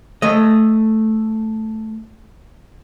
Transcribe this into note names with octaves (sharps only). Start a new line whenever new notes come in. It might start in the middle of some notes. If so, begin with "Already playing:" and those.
A3 D#5